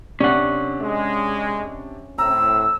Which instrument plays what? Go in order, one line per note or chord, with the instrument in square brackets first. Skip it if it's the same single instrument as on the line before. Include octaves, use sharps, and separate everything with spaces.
[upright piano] C3 D4 [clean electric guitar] C#4 F#5
[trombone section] G#3
[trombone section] A2 C4 [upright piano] A#5 [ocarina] E6